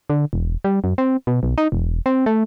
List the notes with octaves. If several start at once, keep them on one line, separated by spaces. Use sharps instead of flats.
D3
E1
G3
F#2
C4
B2
B1
D#4
E1
C4
A3